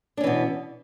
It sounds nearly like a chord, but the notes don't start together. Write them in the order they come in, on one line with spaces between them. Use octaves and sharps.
D4 C#4 E3 B2